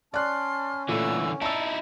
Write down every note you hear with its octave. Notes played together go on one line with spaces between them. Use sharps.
C#4 D5 A5 C6 F6 F#6
A#2 D3 E3 A3 E6
D#4 E4 D5 A5 E6